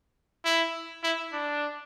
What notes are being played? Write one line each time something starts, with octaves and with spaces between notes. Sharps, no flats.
E4
E4
D4